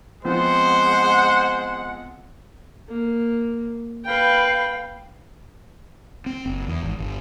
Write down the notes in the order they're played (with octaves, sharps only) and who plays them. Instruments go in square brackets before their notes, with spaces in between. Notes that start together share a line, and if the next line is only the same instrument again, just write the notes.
[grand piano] F3 B3 C4 [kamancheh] G#3 F#5 [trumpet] C5
[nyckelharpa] A#3
[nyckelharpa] B4 G5 [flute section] F5 B5
[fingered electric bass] C4
F#1
E2
G#1
G1